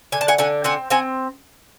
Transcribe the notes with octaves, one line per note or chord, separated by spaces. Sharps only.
D3 G#5
A5
F#5 G#5
D3 F#5 G#5
C4 F#5 G#5
C4 F#5 G#5